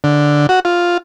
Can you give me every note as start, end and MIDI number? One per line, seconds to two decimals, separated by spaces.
0.04 0.47 50
0.49 0.60 66
0.65 0.97 65